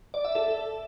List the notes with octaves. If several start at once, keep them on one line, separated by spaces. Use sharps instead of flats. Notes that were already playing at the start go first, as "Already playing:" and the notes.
D5
E5
A4